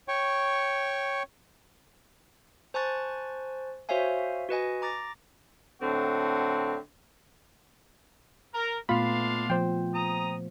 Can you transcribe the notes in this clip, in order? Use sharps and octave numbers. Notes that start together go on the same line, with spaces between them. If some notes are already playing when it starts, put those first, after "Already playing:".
C#5 G5 C#6
C5 G#5 A5 C#6 F#6 A6
F#4 C5 C#5 E5 F5 G#5
F#4 B4 D#5 G#5
A#5 D6 A6 A#6
A2 D3 C4 F#4
A#4
A#2 A3 B3 D4 F4 F5 B5 C6
F3 C5 G5
A#5 D#6